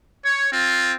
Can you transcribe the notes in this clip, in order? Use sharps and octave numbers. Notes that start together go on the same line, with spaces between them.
C#5
C4 F4